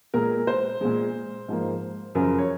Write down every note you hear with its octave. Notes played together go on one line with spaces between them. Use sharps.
A#2 G#3 A#4
C5
A#2 G#3
G#2 F3 A#3
F#2 C#3 F3 A#4
C#5